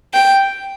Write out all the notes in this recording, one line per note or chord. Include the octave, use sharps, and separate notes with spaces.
G5